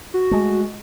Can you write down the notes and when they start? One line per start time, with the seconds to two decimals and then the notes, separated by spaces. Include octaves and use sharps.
0.14 F#4
0.31 G#3 A3